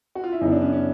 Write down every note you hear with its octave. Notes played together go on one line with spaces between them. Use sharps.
F#4
F4
E4
F#2 C#3 F#3 B3 D#4
D4
C#4
C#4